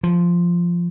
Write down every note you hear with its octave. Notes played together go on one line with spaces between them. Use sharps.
F3